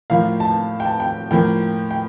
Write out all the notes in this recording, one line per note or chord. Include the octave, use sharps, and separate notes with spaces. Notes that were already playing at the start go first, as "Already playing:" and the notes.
A2 F3 A#3 F5
A5
G5
A5
G5
A2 F3 A#3 G5
G5